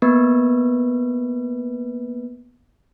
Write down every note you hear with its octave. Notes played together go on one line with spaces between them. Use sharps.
A#3 B3 B4